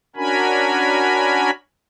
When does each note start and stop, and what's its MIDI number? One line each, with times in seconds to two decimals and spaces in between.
0.16 1.50 61
0.16 1.50 62
0.16 1.50 66
0.16 1.50 70
0.16 1.50 80
0.16 1.50 83